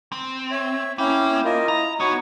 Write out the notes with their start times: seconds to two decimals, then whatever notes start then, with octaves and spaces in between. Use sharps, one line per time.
0.12 C4
0.51 C#5 E5
0.98 A#3 C#4 E4 G5
1.45 F4 A#4 D#5
1.68 E4 A#5
2.00 E2 B3 D#4 F#4 C#5 C#6